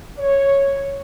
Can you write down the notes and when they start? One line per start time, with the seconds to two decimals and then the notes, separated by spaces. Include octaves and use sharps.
0.18 C#5